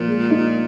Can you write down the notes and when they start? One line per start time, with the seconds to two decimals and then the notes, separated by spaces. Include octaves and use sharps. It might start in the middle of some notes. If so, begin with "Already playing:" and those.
Already playing: A#2 F3
0.08 G#3
0.30 D#4